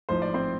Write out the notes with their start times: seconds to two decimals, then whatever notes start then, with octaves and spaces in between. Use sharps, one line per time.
0.09 A1 G#2 F3 C5
0.22 D5
0.34 C4 C5